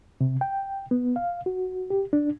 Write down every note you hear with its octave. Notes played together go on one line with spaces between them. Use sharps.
C3
G5
B3
F5
F#4
G4
D4